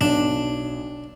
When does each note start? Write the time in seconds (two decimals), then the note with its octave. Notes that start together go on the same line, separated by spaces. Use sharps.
0.01 B1 D4